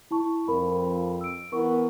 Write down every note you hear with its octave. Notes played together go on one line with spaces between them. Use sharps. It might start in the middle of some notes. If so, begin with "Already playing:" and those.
E4 A5 C#6
F2 A#4 B5
E6 D7
E3 B3 A#4 C#6